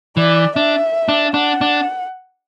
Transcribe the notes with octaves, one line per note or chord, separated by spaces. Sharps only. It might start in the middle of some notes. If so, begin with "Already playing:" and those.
E3 D5
D4 E5
D4
D4 F#5
D4